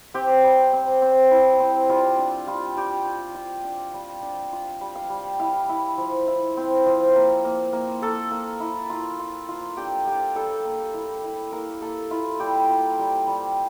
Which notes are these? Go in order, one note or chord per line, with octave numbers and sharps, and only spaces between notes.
C4 G4
G3
C4
C4
E4
C4
G3 F4
D4
G3 F4
G3 G4
F4
F4
D4
G3
D4
F4
G3
F5
G3
E4 F5
E4
F3
E4
C4
F3
A#3
A#3
A#3
A#3 A4
A#3
E4
F4
F4
F4
D4 G4
F4 G4
G3 A4
A#3
E4
E4
A#3 A#4
A#3 A4
E4 F4
G3 G4
F4
G3
G3